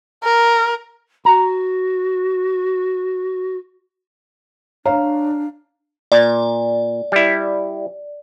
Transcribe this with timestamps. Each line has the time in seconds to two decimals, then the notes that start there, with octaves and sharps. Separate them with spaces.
0.23 A#4
1.25 F#4 A#5
4.86 D4 C#5 F5 A#5
6.12 A#2 D5
7.12 G3 E4